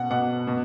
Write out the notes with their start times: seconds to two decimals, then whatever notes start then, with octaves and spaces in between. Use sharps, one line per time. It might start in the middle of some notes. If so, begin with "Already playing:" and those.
Already playing: B2 F#5
0.10 B2 F#5
0.47 B2